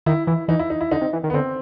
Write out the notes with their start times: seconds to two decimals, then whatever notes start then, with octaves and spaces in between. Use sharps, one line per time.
0.06 D#3 E4
0.27 E3 E4
0.48 E3 D#4
0.59 E4
0.70 D#4
0.81 E4
0.91 D3 D#4
1.01 C3
1.13 E3
1.24 D#3
1.30 B3
1.33 D3 C4